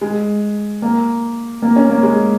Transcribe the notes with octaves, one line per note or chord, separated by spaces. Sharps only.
G#3
A#3
A#3
C#4
A#3
G#3